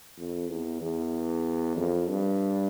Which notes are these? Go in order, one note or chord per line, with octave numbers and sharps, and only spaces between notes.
F2
E2
E2
F2
G2